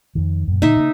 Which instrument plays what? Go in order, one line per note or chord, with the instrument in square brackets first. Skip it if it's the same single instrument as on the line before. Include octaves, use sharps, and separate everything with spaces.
[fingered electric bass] F2 D#3
F#2 A#2
[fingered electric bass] A#2 D3 [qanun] D#4 E5
[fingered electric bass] C#3 A#3